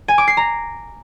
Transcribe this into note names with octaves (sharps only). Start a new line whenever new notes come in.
G#5
D6
C7
A#5